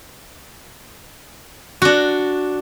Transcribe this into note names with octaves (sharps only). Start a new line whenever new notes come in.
D4 F#4